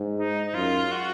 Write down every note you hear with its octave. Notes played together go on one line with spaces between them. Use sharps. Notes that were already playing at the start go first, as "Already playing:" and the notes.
Already playing: G#2
D#4
D#4
F#2 F4
F#4